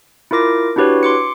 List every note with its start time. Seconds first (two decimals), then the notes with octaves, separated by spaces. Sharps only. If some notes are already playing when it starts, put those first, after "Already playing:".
0.31 E4 F4 A#4 D6 A#6
0.76 D4 E4 F#4 G4 B4 C#5
1.03 C6 D6 C#7